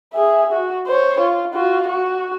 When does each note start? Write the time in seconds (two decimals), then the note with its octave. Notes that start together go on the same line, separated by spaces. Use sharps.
0.14 G#4 E5
0.53 F#4
0.87 C5 C#5
1.21 F4
1.54 F4 F#4
1.88 F#4